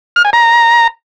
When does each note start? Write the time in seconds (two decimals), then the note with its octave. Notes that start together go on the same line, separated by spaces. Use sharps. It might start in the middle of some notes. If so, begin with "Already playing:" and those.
0.16 F6
0.25 G#5
0.33 A#5